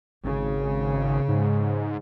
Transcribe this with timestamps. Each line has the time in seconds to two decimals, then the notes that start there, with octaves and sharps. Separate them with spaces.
0.24 G#1 C#3
1.28 G#2